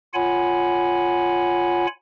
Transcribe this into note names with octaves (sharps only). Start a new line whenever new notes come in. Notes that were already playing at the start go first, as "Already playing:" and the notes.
F4 C#5 F#5 G#5 B5